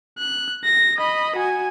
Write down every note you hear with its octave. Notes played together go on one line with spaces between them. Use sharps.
F#6
A#6
D#5 B5
F#4 G#5